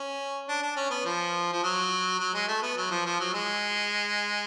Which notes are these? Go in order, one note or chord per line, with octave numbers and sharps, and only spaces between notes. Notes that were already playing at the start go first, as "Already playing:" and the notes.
Already playing: C#4
D4
D4
C#4
B3
F3
F3
F#3
F#3
G#3
A3
B3
F#3
F3
F3
F#3
G#3